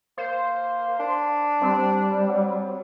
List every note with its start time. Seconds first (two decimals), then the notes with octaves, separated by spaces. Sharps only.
0.18 A#3 C5
0.99 D4
1.62 G3 C4
2.29 F#3